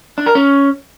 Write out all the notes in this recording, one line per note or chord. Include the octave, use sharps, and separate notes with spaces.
D4
A#4
C#4